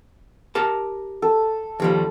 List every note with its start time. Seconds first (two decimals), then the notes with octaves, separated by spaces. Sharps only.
0.55 G4 A#4 A5
1.22 A4
1.80 D#2 F3 G3